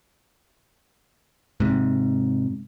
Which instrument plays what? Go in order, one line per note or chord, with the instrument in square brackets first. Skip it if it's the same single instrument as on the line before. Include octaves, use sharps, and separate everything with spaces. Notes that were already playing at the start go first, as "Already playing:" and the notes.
[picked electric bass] G#2 C3